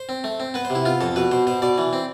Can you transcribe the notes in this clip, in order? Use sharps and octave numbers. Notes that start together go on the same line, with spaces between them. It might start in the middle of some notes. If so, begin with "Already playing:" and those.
Already playing: C5
C4
A3
C4
B3 B4
C5
C3
E4
B3 F4
F2 A4
B2 B4
B2 C5
B2 C5
B2 D5
E3
C4